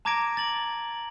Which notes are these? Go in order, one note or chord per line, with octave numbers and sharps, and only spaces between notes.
A5 A#5 D6 G#6 A#6 D7
A6 F#7